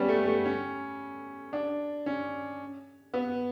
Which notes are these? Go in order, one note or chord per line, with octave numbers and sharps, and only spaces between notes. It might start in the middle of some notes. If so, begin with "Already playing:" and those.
Already playing: G3 B3 C#4
A3
A3
C#4
D4
C#4
B3